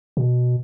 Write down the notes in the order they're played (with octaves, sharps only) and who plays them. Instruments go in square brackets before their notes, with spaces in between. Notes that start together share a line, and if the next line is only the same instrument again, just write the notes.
[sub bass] B2